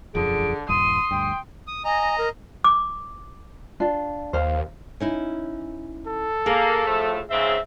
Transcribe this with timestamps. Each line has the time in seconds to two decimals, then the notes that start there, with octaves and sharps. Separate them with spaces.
0.15 E1 F#2 D3 F3 G#4 D7
0.69 D#1 G2 C6 D#6 D#7
1.11 D2 G2 G5
1.67 D#6
1.85 D#5 G#5 A#5
2.18 A#4
2.64 D6
3.80 D4 F4
4.33 D#2 C5 F5
5.00 C#4 D#4 E4
6.07 A4
6.46 A#3 G#4
6.86 A2 F3 A3
7.30 G#2 C#3 C4 E5